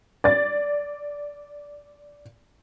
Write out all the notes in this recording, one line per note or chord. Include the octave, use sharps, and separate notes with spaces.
D5 A6